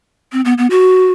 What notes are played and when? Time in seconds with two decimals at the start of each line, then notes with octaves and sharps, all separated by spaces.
0.33 C4
0.45 B3
0.58 B3
0.70 F#4